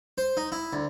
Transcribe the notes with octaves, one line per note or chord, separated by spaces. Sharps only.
C5
D#4
E4
D2